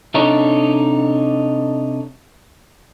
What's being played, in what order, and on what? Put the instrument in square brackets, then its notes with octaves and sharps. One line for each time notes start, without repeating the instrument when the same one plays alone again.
[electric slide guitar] C3 D4 D#4 A4 C#5